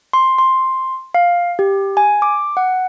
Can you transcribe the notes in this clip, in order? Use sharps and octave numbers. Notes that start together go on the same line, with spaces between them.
C6
C6
F5
G4
G#5
D6
F#5